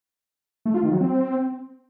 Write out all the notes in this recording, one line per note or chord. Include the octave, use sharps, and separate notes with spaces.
A3
F4
D#3
F#3
C4